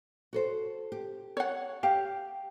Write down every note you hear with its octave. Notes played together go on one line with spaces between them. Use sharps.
F#4 A4 C5
G4
C#5 F#5
G4 F5